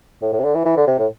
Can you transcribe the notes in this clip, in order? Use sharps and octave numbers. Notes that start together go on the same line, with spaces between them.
A2
A2
C3
D3
E3
E3
D3
C3
A2